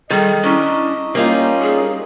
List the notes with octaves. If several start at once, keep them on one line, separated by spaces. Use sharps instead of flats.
D#3 G3 G#4 A4 D#5 G5
C#4 D4 E4 A#5 C#6
G3 A#3 C#4 D#4 F4 A#4 A#5
G#4